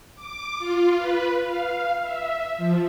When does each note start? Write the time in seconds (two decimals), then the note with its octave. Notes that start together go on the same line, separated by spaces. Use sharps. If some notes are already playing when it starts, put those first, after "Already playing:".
0.16 D6
0.58 F4
0.98 B4
1.44 F5
2.01 E5
2.57 F3